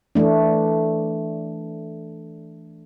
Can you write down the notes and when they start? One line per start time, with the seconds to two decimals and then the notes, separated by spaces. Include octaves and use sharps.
0.15 E3 A3 D4